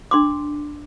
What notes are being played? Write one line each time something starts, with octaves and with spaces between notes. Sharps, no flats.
D4 C6 D6